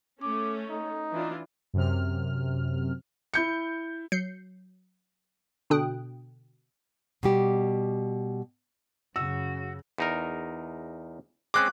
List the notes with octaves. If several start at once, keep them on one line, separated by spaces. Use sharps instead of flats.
A3 C#4 D6
D#4
E3 D4 F4
F#2 C3 F6
E4 G6 C#7
F#3 G6 C7 C#7
B2 D3 D4 G5 D#6 F#6
B2 G3 G4
F#2 C#3 F#4 E6
E2 D#4 A#4
G#3 C4 C#4 D6 F#6